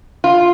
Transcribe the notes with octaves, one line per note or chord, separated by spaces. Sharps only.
F4